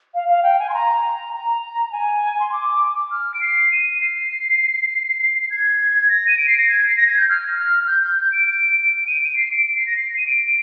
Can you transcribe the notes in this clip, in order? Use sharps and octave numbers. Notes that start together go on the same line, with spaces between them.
F5
F5
G5
G#5
C6
A#5
A#5
G#5
C6
D6
F6
D7
C7
D#7
C7
G#6
A#6
D#7
D7
C7
A#6
G#6
C7
A#6
G#6
G6
F6
F6
F6
G6
G6
G6
D7
D7
D7
D#7
D7
C7
D7
D7
C7
A#6
C7
D#7
D7